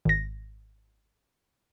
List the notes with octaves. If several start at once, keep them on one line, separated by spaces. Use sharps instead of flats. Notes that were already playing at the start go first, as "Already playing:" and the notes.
G#1 A#6